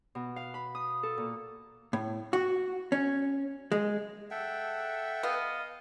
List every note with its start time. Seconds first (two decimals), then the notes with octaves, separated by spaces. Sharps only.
0.15 B2
0.36 F5
0.54 B5
0.75 D#6
1.03 A4
1.18 A#2
1.93 A2
2.33 F#4
2.92 C#4
3.72 G#3
4.31 A4 E5 F#5 G5
5.23 B3 D#5 F5